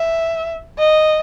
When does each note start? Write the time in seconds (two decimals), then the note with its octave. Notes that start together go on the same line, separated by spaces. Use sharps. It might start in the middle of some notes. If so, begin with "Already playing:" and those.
Already playing: E5
0.79 D#5